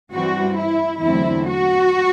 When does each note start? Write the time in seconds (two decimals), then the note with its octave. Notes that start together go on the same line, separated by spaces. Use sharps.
0.13 G2 E3 G3 C4 F#4
0.57 E4
1.02 E2 D3 F#3 A3 C4 E4
1.48 F#4